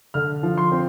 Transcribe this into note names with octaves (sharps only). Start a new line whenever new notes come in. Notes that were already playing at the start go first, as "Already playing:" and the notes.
D3 F6
F3
C6
C4